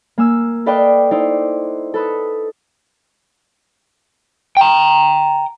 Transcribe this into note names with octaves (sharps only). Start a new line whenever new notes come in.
A#3 G#5 E6
A4 B4 D5 D#5 F5 G5
D#4 E4 C5 D5
A4 B4 D#6
G5 A#5